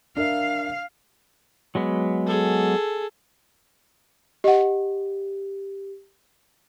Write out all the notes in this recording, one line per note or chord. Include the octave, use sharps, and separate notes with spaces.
D4 A#4 E5 F5
F#3 G#3 B3
G#4 A4
G4 D#5 F#5